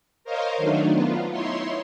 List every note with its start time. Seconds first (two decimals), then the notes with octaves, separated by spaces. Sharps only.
0.24 A#4 C5 C#5 D#5 F5
0.57 D#3 F#3 A3 D4 D#4
0.90 B3 F4
1.32 D#4 E4 C#5 C6